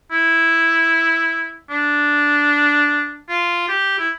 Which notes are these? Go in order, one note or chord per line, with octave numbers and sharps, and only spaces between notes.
E4
D4
F4
G4
E4